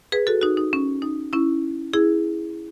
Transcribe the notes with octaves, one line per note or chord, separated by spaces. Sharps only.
G#4 B4
F#4 A4
D#4 F#4
D#4
C#4
D#4
C#4 E4
E4 G#4